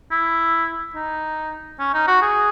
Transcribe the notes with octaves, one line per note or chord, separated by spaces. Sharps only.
E4
D#4
C#4
D#4
F#4
G#4